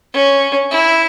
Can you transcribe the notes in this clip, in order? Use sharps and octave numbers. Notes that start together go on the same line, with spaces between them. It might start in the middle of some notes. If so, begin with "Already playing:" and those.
C#4
E4